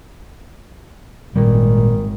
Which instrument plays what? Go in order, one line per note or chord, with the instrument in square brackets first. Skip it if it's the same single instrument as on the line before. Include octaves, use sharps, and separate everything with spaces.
[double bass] G#1 [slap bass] A#2 G3 [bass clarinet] D#3